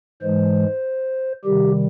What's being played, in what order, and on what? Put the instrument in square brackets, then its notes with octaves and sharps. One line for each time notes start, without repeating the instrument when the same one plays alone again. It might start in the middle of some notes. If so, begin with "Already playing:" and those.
[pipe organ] G#2 E3 G#3 C5
C3 D#3 G3 G4